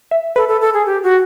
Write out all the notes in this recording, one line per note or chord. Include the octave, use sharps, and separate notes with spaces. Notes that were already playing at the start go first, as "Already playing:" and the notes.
E5
A4 B4
A4
A4
G#4
G4
F#4